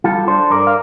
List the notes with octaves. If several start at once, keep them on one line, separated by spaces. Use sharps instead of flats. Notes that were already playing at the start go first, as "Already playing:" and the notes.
G3 F4 A4
D4 A4 C5
G2 A#4 D5
F5